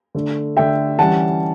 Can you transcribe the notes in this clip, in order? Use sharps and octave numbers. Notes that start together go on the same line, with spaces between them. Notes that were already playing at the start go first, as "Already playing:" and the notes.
D3 A3 D4
D3 A3 D4 E5 G5
E3 G3 C#4 F#5 A5